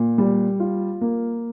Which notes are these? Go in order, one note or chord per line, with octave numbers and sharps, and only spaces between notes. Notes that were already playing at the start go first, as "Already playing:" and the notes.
Already playing: A#2
G3
F4
A#3